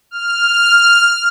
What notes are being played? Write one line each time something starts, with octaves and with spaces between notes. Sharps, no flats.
F6